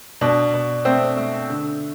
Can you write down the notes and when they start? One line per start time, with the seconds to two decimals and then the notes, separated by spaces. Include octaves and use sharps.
0.21 B2 D4
0.54 B2
0.85 A3 C4
1.17 A3
1.50 D3